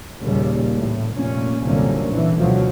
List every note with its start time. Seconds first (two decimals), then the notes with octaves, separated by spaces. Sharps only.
0.22 A#1 D#2 A#2 C#3 G3
0.73 A1 A2
1.12 F1 A#2 C#4
1.62 C2 F#2 A#2 D3 A#3 C#4
2.08 A#2 D3 E3
2.36 D2 B2 F3 F#3